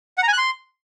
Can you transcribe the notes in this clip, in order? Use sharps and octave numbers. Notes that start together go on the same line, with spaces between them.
F#5
A#5
G#5
F#6
C6